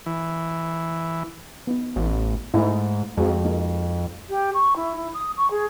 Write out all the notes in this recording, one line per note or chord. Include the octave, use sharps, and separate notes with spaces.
E3
B3 D#4
A1
G#2 A3 D#4 E4
F2 G#3 F#4
A#3 D#4
G4
C#6
E4
E4
D#6
C#6
G#4